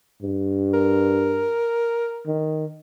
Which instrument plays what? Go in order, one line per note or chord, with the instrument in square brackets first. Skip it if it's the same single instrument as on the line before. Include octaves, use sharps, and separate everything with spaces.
[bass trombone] G2
[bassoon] A#4
[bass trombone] D#3